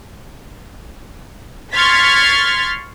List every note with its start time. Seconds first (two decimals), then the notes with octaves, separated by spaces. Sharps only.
1.73 C6 C#6 F6 G#6 A6 B6